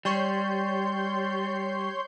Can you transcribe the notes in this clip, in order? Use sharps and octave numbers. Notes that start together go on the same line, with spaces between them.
G3 C#5 C6 G6